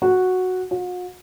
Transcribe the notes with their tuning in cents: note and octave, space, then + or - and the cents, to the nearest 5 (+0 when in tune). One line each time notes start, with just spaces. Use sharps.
F#4 -5
F#4 -45